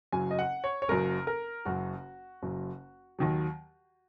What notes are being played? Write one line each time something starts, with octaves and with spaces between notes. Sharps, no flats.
F#1 F#2 F#3 G#5
D#5
F#5
C#5
C#5
F#1 F#2 F#3 A#4
A#4
F#1 F#2 F#3 F#4
F#1 F#2 F#3
D#2 D#3 F#3